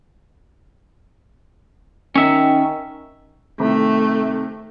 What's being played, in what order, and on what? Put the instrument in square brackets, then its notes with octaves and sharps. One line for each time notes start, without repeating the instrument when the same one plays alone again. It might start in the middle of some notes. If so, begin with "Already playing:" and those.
[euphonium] D#3 [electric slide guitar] C#4 E5
[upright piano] C3 D#3 [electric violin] A3